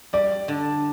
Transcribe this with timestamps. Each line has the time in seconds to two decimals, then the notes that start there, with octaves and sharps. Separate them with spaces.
0.13 G3 D5
0.48 D3